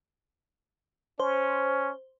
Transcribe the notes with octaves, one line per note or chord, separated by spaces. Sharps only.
C#4 C5